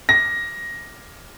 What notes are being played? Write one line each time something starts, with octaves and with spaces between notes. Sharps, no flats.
A#6